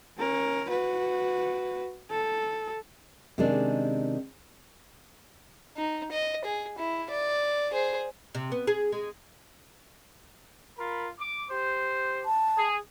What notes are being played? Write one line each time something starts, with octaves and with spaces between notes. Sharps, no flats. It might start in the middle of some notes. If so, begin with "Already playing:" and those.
C#4 A#4
F#4 B4
A4
C3 D#3 G#3 C#4 D4
D#4
D#5
G#4
E4
D5
G#4 C5
C3
B3
G#4
G#3
F4 A#4 B5
D6
G4 C5
A5
G#4